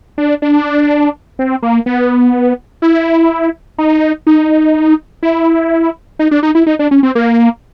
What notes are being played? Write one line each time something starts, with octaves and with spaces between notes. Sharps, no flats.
D4
D4
C4
A#3
B3
E4
D#4
D#4
E4
D#4
D4
D#4
E4
D#4
D4
C#4
C4
A#3